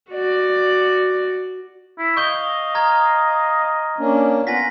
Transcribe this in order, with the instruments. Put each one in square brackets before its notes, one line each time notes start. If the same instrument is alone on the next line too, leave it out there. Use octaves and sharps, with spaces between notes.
[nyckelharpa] F#4 D5
[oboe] E4
[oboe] D#5 [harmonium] F5 [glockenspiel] C#6 G6 G7
[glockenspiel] A#5 F6 G#6
[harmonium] A#3 C#4 D4
[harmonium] B3 F4 F#5 [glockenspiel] G#5 A#6 B6